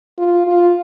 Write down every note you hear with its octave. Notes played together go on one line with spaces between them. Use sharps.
F4
F4